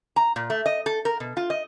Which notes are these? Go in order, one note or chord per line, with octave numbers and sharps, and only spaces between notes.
A#5
A#2
A3
D#5
A4
A#4
B2
F4
D#5